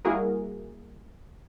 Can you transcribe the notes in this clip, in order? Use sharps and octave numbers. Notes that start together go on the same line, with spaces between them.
G3 A#3 E4 F#4 G#4 A#4